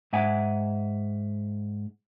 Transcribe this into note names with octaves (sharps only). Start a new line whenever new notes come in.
G#2 E5 F#5 G#5